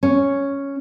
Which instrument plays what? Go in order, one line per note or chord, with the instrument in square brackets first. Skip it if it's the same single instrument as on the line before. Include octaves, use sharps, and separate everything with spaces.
[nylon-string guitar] C#4